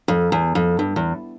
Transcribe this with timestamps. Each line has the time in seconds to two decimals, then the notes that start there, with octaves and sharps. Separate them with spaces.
0.08 F2
0.32 E2
0.55 F2
0.79 G2
0.96 E2